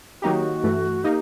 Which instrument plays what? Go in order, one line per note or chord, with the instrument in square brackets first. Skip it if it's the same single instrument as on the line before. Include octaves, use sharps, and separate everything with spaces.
[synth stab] D#3 F#3 A#3 D#4 G4 [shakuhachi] F#4
[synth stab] G2 E3 A3
[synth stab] A#3 D#4 [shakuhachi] G4